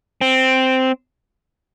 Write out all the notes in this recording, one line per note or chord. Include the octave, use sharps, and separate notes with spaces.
C4